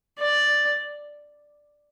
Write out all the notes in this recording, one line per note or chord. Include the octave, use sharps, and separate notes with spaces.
D5